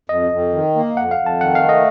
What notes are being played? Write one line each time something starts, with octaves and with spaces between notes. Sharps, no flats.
F2 D#5
F2
D#3
A#3
F2 F#5
F5
F2
A5
D#3 F#5
F5
A3
D#5